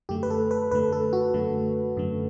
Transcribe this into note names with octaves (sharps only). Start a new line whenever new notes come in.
F#2 D3 A3 G4
B4
A4
B4
F#2 D3 A3 B4
A4
F#4
F#2 D3 A3
F#2 D3 A3